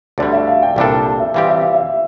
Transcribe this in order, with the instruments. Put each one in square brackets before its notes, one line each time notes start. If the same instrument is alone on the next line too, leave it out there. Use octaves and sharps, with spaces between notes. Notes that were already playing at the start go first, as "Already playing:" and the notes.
[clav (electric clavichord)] D2 D3 G3 [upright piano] D5
[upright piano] E5
F5
G5
[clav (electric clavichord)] C2 A#2 G3 D4 A4 [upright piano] G5
[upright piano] A5
E5
[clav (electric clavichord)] E3 G3 C4 G4 [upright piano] F5
[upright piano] E5
F5
E5